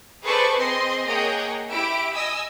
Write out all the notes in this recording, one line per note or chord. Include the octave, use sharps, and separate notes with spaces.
G#4 A4 B4 C5 D5 C#6
C4 G#4 D#5 C6
A#3 G#4 C#5 D#5 F#5 G5
E4 G4 E5 D7
D#5 G#5 D#6 E6